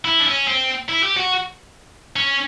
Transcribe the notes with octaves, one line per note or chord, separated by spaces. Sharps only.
E4
D4
C#4
C4
E4
G4
F#4
C#4